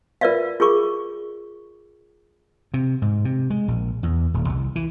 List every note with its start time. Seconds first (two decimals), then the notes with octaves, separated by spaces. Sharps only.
0.21 F4 A#4 B4 D5 E5 F5
0.60 F4 G#4 A#4 C#6 D6
2.74 C3
3.02 G#2
3.25 C3
3.50 G#3
3.68 A#1
4.03 E2
4.34 D#1
4.49 C2
4.76 E3